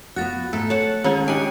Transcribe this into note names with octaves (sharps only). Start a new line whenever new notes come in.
B3 F4 F#4 F#6 A6
G#2 A3 A4
C#5 F#5 A5
D#3 G#3 C#4 F4
D4 D#4 G4 F#5 G#5 D7